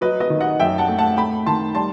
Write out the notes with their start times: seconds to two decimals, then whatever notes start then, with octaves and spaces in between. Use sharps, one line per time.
0.01 F#3 B4 D#5
0.20 B4 D#5
0.30 D#3
0.41 D#5 F#5
0.60 F#2 E5 G5
0.78 F#5 A5
0.88 A3
0.98 F#5 A5
1.17 A3 G5 B5
1.46 D#3 A5 C6
1.75 G3 A5 C6